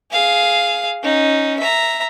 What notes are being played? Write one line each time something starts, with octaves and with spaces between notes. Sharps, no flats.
G#4 F5
C#4 D#4
E5 A#5